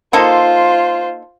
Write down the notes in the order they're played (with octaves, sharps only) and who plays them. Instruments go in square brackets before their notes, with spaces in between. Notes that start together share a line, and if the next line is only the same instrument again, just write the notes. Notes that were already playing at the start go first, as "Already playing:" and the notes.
[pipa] A#3 D#4 A4 [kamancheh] F4 C5